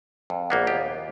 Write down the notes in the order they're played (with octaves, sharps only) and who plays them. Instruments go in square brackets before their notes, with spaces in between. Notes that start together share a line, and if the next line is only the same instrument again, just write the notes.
[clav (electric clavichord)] F2
[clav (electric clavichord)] A#1 A#3 B3 [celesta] F#5
[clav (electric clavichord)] D#2 F4 G4